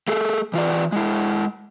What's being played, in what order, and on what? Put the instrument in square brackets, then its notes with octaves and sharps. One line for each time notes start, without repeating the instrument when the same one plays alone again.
[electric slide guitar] A3 G#4 A4
E3 F4 B4 D5
G#3 E4